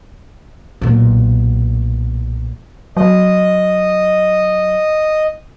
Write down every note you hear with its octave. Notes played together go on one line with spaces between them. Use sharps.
B1 A#2
F#3 D#5